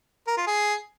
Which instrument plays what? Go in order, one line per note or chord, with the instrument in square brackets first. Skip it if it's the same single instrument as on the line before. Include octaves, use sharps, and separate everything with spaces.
[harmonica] A#4
F4
G#4